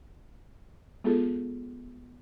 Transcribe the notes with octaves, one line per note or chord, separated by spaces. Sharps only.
G#3 B3 F4 G#4 A4